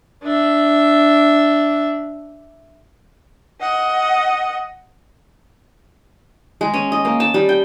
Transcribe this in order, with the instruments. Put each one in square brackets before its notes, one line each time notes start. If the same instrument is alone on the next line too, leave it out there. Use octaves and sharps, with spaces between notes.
[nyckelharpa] D4 E5
[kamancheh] D#5 F#5
[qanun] G#3
C#4
D#5
A#3
A5
G3
G5